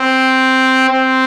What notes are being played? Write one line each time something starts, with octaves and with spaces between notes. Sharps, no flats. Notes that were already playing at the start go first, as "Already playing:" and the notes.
Already playing: C4
C4